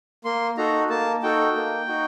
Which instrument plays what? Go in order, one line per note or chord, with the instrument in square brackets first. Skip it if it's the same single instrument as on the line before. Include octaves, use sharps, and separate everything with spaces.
[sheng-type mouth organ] A#3 C6
D#4 F#4 A4 A#5
A#3 A5
D#4 F#4 A4 G5
A#3
D#4 F#4